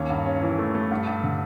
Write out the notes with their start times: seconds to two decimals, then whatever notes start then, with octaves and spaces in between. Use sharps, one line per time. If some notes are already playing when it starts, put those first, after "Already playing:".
Already playing: D#2 C#4
0.10 G2
0.26 C#4
0.42 E3
0.58 A3
0.75 A3
0.91 G2
1.07 G2
1.24 D3